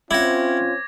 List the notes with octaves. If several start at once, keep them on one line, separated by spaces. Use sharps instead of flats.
C4 C#4 E4 F4 F#5 D6 G#6 A#6